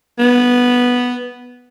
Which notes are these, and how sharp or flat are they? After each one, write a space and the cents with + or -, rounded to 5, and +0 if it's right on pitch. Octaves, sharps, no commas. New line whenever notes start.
B3 -5